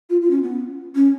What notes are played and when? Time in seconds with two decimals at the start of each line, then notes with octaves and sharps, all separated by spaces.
0.10 F4
0.21 F4
0.31 C#4
0.43 B3
0.95 C#4